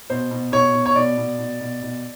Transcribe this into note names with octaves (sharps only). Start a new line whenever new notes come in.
B2 C5
B2
B2 C#5
B2
C#5
B2 D5
B2
B2
B2
B2